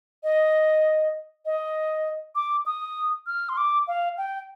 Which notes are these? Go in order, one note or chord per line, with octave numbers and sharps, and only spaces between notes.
D#5
D#5
D6
D#6
F6
C6
D6
F5
G5